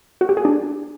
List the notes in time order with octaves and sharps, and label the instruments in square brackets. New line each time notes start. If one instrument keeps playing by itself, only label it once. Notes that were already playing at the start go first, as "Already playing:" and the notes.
[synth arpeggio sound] F#4
G4
G#4
D4